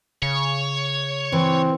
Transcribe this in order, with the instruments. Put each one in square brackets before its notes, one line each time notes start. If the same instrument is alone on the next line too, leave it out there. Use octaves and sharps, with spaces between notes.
[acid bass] C#3 [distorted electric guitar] C#5
[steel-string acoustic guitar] E3 [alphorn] C4